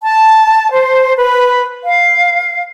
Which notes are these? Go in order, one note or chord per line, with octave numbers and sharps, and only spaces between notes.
A5
C5
B4
F5